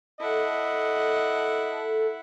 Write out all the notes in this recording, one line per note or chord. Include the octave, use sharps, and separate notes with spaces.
E4 A4 D#5 F#5